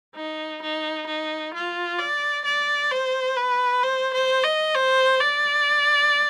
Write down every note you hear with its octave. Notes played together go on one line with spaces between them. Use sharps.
D#4
D#4
D#4
F4
D5
D5
C5
B4
C5
C5
D#5
C5
D5